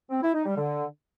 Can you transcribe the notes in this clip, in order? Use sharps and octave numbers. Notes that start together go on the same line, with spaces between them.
C4
E4
D#4
G3
D3